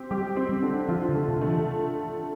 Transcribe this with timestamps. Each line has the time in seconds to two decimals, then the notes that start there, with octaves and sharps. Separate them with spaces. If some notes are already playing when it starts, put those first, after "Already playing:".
Already playing: C4 G4
0.11 G3 G4
0.36 C4
0.49 G3
0.62 D3
0.88 F3 F4
1.09 D3
1.14 A3
1.29 C3
1.41 A3
1.48 E3